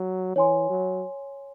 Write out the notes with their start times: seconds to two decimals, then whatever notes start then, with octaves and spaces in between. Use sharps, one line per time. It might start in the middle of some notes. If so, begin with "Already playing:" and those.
Already playing: F#3
0.36 E3 C#5 G#5 C6
0.70 F#3